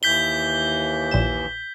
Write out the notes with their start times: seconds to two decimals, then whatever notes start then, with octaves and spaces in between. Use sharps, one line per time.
0.03 D#2 E3 G6 B6 G7
1.11 A#1 E7